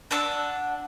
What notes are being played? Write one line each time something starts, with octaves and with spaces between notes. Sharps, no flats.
D4 F#5 A5 E6